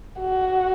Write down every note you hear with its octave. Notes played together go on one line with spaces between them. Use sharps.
F#4